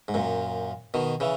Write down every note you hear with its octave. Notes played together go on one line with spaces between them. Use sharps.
G#2
F#2 A#2
B2 D#3
C#3 E3